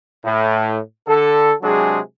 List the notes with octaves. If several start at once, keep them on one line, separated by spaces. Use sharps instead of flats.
A2
D3 A4
C3 F#3 G#3 D4 G#4